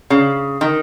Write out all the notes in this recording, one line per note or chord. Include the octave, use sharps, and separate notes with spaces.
C#3
D#3